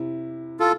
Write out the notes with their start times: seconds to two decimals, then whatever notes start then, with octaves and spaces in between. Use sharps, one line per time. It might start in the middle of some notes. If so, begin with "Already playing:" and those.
Already playing: C3 E4
0.60 F4 A4